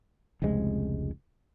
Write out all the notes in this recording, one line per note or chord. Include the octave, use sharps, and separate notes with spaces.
F1 C#2 C3 G#3